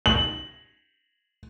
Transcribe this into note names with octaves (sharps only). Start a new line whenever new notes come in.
F#7